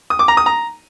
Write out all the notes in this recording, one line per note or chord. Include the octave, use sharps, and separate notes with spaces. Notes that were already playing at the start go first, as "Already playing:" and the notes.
D#6
D6
A#5
D#6
A#5